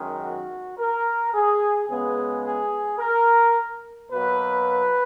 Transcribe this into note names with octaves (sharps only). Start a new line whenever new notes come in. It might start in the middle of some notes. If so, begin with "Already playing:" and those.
Already playing: F#2 D#3 G#3
F#4
A#4
G#4
C#3 G#3 B3 G#4
G#4
A#4
B2 F#3 A#3 B4